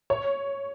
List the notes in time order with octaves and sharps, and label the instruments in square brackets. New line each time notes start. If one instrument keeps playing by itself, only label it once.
[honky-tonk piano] C#5